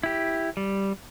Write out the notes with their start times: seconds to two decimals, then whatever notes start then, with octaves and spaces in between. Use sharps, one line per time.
0.03 E4 G4
0.57 G3